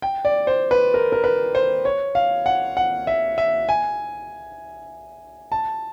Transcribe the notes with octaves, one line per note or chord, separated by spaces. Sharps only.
G5
D5
C5
B4
A#4
A#4
B4
C5
C#5
F5
F#5
F#5
E5
E5
G#5
A5